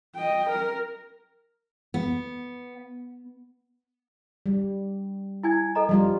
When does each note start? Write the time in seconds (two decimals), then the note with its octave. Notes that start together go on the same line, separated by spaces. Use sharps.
0.16 D#5 G5
0.50 A#4
1.94 B3
4.46 G3
5.43 E4 G#5 G#6
5.75 A4 D#5 A#5
5.89 F3 G3 F4